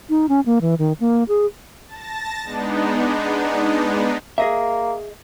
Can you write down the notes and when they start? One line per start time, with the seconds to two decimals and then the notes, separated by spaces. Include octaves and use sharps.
0.10 D#4
0.29 C#4
0.46 A#3
0.61 E3
0.79 D#3
1.00 A#3
1.28 G#4
1.87 A5 A6 A#6
2.45 G#3 B3 D4 D#4
4.38 A#3 G#4 D#5 E5